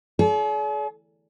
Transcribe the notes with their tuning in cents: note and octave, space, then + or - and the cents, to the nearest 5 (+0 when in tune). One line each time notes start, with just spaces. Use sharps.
G#4 +45 D5 -40